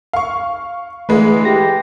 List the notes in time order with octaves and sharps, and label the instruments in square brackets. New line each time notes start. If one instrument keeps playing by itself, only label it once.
[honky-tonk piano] F5 C#6
[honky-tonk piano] D3 G#3 B4 [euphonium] E3 [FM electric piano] A3
[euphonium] G4 [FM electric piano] A#6